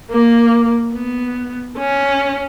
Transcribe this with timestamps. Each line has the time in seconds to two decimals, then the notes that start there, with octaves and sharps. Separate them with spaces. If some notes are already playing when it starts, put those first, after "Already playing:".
0.11 A#3
0.94 B3
1.78 C#4